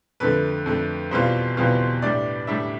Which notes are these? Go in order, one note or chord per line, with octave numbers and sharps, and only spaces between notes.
F2 D3 A3 B4
F2 D3 A3
E2 B2 G3 C4 F4 C5
E2 B2 G3 C4 F4
A2 G3 D4 D5
A2 G3 D4 E5